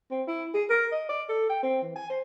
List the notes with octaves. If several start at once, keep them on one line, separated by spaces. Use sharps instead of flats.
C4
E4
G#4
A#4
D#5
D5
A4
G5
C4
E3
G#5
C5